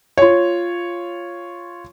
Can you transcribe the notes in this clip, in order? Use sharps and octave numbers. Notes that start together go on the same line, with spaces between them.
F4 C#5